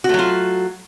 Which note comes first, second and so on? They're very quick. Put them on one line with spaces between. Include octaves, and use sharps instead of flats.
F#4 A3 F#3 F4